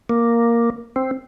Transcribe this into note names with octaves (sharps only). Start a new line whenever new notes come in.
A#3
C4